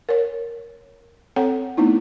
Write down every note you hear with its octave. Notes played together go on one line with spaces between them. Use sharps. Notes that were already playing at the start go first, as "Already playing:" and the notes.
A#4 C#5
C4 A4 C#5 F#5 G5
A3 B3 C4 D#4 E4